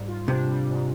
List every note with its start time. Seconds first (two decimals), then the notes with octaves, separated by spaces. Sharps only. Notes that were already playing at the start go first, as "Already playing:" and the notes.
Already playing: G#2 G3
0.08 F4
0.28 C3 D4
0.48 G3
0.69 G#2